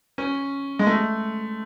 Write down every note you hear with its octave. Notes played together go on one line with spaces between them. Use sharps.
C#4
G#3
A3